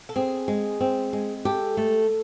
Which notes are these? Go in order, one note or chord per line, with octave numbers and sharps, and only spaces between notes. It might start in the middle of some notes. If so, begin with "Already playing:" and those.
A4
C4 G#4
G#3
C4
G#3
G4 A4
A3